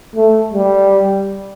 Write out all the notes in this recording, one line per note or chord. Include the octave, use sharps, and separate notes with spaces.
A3
G3